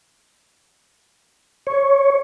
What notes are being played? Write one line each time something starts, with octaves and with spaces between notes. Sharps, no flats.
C#5